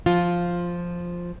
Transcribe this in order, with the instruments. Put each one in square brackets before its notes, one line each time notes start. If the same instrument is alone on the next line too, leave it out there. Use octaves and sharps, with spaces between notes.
[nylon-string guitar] F3 F4